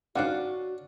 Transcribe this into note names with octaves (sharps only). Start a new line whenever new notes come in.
D#2 G#2 C#4 D4 F#4 D5 F5 F#5